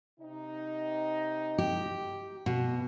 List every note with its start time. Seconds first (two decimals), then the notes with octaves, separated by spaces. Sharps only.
0.20 C3 D#4
1.58 G4
2.46 B2